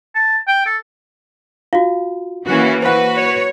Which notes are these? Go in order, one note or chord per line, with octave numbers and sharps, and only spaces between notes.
A5
G5
A4
F4 F#4 F5
E3 A#3 C#4 F#4
F#4 B4 C5 F#5
C#5